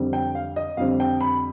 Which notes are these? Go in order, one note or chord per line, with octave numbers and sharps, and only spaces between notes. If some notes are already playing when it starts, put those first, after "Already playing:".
Already playing: F2 D3 G3 C4
G5
F5
D#5
F2 D3 G3 C4 F5
G5
B5